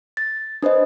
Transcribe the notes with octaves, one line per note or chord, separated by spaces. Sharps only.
A6
D4 B4 C5 D#5